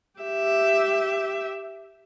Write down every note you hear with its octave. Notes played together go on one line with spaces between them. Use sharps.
G4 E5